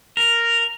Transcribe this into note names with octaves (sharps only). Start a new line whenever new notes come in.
A#4